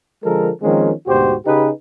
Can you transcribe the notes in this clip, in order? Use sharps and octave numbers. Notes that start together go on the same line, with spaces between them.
D3 F3 G#3 A4 A#4
D#3 F3 G#3 A#3 C4 C#4
D2 G#2 B2 F#4 G4 C5
C#3 D#4 G4 G#4 B4